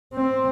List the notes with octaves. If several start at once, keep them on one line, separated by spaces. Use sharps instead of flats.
C4